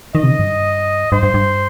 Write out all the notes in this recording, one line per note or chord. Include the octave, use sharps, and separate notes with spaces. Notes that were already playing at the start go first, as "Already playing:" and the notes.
D#3 D#5
C3
D#3
G2
G2 C5
G2
G2